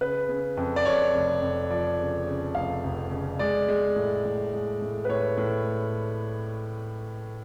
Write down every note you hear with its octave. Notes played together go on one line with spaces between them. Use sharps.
C#3 B4
C#3
F2
D5
F2 C#5
F1
F2
F3 D5
C#3
C#3
F1 F5
F1
C#3
G#3 D5
G#3
A2
A2
G#3
A2
B4
A2 C#5
A2